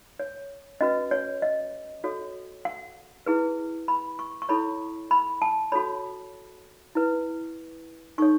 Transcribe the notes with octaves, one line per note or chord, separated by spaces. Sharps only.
C#5
C#4 F#4 B4 D#5
C#5
D#5
F#4 A4 C#5
F#5
E4 G#4 B4
B5
C#6
C#6
E4 A4 C#5 B5
B5
A5
F#4 A4 C#5 B5
E4 B4
D#4 A4 C#5 C#6